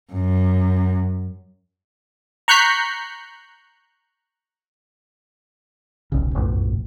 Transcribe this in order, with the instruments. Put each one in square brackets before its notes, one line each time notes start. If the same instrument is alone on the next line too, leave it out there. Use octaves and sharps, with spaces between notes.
[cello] F#2
[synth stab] A#5 C#6 F#6 G6 B6 C7
[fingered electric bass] D#1 B1 C#3
F#1 B1 F2 A2